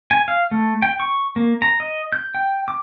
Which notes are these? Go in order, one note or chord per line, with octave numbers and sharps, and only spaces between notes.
G#5
F5
A3
G5
C#6
A#3
A#5
D#5
G6
G5
D6